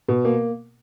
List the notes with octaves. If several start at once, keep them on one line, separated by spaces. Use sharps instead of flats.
B2
A#3